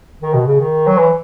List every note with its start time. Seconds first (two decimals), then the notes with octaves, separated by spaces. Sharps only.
0.22 D#3
0.34 B2
0.47 C#3
0.60 D#3
0.87 F#3
0.97 E3